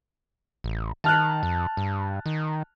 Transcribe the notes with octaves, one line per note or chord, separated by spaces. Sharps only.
A1
D#3 A5 F6 F#6
F2
G2
D#3